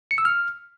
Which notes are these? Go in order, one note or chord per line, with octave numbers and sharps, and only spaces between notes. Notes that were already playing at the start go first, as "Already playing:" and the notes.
C#7
E6
F6